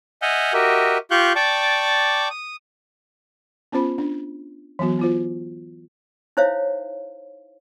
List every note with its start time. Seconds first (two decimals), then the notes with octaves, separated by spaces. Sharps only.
0.22 D#5 E5 F#5 G#5 F6 G6
0.53 F#4 G4 A#4 D#5 E5
1.11 F4 G4 F5 C#6 F#6 G6
1.35 D5 G5 A5 C#6 D6
2.30 D#6
3.72 B3 C#4 F4 C5 B5
3.98 D4
4.79 E3 F#3 B3 F#4
4.99 B3 F4 C5
6.37 D#4 E4 C5 C#5 E5 F5